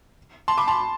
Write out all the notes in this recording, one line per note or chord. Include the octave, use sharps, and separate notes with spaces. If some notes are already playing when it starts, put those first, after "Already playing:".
A5 C6
B5 D6
A5 C6